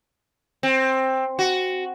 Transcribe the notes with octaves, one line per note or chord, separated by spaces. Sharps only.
C4
F#4